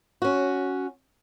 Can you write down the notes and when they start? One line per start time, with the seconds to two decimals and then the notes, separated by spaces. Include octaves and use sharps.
0.22 C#4 F#4